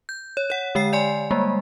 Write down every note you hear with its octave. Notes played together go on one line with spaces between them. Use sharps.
G6
C#5
C#5 F#5
D3 G#3 G5 C7
D5 G#5 C6
G3 G#3 A#3